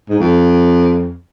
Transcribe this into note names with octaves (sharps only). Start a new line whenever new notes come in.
G#2
F2